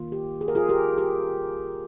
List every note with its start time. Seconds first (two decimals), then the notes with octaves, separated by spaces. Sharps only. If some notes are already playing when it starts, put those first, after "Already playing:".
Already playing: D#3 A#3 F4
0.12 G4
0.41 G#4
0.48 A#4
0.55 F4 G#4
0.69 G4 A#4
0.98 G4